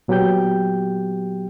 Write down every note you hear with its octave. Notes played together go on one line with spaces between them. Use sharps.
A#2 F#3 B3 G4 G5 G6